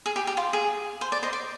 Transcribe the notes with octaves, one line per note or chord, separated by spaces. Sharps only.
G#4
G4
G4
F4
G#4
C5
D5
C5 D#5
D5